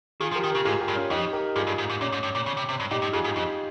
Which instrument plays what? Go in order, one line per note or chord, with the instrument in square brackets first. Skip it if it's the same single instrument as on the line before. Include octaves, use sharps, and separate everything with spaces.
[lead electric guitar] D#3 [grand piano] F4 G#4
[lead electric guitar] F3
[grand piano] G4 A#4
[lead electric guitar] D#3
[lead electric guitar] C#3 [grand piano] G4 A#4
[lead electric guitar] G#2 [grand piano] F4 G#4
[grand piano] G4 A#4
[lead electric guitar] G2
[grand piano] C#4 F4
[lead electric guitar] F2 [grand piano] D#4 G4
[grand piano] G4 A#4
[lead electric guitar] G2 [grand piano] F4 G#4
[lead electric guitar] G2
G#2
G#2
[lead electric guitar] A#2 [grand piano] C#4
[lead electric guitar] G#2
G2
A#2
C#3
C3
C3
G2
[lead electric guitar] A#2 [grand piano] D#4 G4
[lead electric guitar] G2
[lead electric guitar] F2 [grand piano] F4 G#4
[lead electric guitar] G#2
[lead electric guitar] F2 [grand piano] D#4 G4